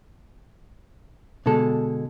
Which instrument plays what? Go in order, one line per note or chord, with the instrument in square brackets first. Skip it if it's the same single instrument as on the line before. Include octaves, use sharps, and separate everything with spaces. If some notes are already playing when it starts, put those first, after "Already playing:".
[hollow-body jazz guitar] B2 D3 G#3 A4